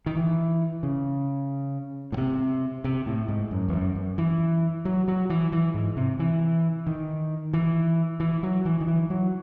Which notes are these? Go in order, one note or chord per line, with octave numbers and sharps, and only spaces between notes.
D#3
E3
C#3
A2
C3
C3
A2
G#2
F#2
E2
F#2
F#2
E3
F#3
F#3
E3
E3
G#2
C3
E3
D#3
E3
E3
F#3
E3
D#3
E3
F#3